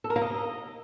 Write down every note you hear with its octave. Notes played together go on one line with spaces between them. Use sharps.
A4
A#4
A#3
D#5